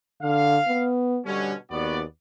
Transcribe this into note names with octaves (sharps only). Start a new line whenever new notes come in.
D3 F5
B3
B2 D3 G3 C#4
D#2 B3 F#4 D5